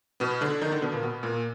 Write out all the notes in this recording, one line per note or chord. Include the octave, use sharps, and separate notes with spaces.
B2 B3
D3 D4
D#3 D#4
D3 D4
B2 B3
A#2 A#3
B2 B3
A#2 A#3